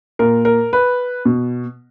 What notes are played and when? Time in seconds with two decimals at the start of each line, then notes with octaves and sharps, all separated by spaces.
0.19 A#2 A#4
0.45 A#4
0.73 B4
1.25 B2